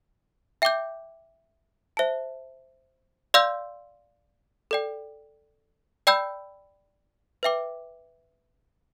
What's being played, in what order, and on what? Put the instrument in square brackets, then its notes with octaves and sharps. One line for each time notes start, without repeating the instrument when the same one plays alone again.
[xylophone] E5 G5 D6 G6
C5 E5 A5
D5 F5 C6 E6 G6
A4 D5 G5
D5 G5 B5 E6 G6
B4 E5 G5 D6